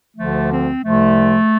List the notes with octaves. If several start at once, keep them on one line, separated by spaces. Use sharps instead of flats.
D2 D3 F3 A3
C4
C2 C3 F3 A3